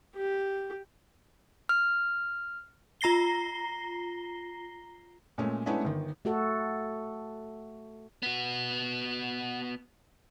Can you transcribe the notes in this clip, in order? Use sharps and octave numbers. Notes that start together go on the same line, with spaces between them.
G4
F6
F4 A#5 A#6 C7 G7
A#2 G#3 A3 C#4
G#3 A3 B3 C#4 D4 E4
G1 D#3
A3 F#4 A4
B3 F#4